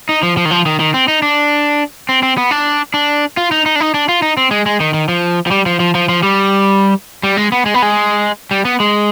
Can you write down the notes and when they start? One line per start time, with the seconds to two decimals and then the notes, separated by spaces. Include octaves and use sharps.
0.09 D#4
0.23 F3
0.37 F3
0.45 D#3
0.51 F3
0.66 D#3
0.80 D#3
0.94 C4
1.08 D#4
1.22 D4
2.09 C4
2.23 C4
2.37 B3
2.51 D4
2.94 D4
3.37 F4
3.52 D#4
3.66 D#4
3.76 D4
3.80 D#4
3.94 D4
4.09 F4
4.22 D#4
4.37 C4
4.51 G#3
4.66 G#3
4.80 D#3
4.94 D#3
5.09 F3
5.47 F3
5.51 G3
5.66 F3
5.80 F3
5.95 F3
6.09 F3
6.23 G3
7.23 G3
7.37 G#3
7.52 B3
7.66 G#3
7.74 B3
7.82 G#3
8.51 G3
8.65 B3
8.80 G#3